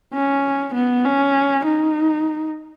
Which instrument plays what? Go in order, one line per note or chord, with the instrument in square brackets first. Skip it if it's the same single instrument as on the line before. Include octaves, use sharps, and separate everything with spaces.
[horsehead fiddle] C#4
B3
C#4
D#4